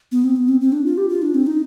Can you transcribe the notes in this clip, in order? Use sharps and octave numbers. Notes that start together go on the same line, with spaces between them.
B3
C4
B3
C4
C4
D4
F4
G4
F4
D4
C4
D#4